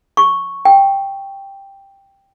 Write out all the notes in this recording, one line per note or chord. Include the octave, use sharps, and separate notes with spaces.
C#6
G5